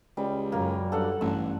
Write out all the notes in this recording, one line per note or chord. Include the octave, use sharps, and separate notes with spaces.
C#2 G3
F#2 A#3
G2 A4 F#5
A1 G2 E6